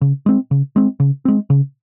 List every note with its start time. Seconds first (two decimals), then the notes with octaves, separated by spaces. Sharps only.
0.01 C#3
0.26 G#3 C4
0.51 C#3
0.76 G#3 C4
1.00 C#3
1.25 G#3 C4
1.50 C#3